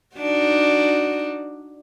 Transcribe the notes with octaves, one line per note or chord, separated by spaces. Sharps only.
D4 D#4 F#4